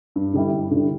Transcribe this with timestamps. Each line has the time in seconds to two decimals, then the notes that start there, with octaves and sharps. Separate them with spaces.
0.16 G2
0.34 D3 G3 E4
0.52 G2
0.71 D3 G3 E4